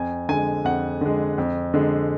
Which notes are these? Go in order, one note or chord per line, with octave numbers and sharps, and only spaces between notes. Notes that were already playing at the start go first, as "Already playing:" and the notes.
Already playing: F2 G#5
D3 G#3 G#5
F2 F#5
D3 G#3
F2
D3 G#3